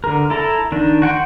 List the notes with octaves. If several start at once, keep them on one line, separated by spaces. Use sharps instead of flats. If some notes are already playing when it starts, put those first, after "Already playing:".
D3 A#4
E4 A4 A#5
D#3 D4
F#4 F#5 G5 C6